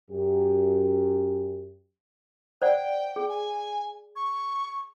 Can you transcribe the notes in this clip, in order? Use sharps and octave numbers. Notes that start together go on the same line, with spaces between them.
F#2 G4
C5 D5 F#5 G5
G#4
G#5
C#6